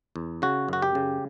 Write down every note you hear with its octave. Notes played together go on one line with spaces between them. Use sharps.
E2
C#3 F#4
F#2 F#4
G4
C#3